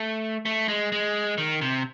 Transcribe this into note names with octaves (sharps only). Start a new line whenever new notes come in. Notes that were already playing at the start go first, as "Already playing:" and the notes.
Already playing: A3
A3
G#3
G#3
D#3
C3